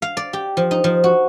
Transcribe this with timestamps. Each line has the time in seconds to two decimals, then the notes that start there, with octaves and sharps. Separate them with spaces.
0.02 F5
0.17 D5
0.33 G4
0.57 F3
0.71 D#4
0.84 F3
1.04 F#4